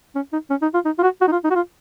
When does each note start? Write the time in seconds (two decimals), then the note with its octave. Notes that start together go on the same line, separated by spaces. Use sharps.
0.16 C#4
0.33 D#4
0.50 C#4
0.62 D#4
0.74 F4
0.85 D#4
0.99 F4
1.03 F#4
1.21 F#4
1.28 D#4
1.32 F4
1.45 D#4
1.50 F#4
1.55 F4